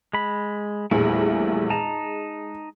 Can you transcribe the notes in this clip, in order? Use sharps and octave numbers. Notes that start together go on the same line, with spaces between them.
G#3 B5
A#1 E2 G3 A3 E4 G#4
G#3 D#4 A5 A#5